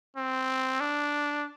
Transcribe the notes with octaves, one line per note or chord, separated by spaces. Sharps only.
C4
D4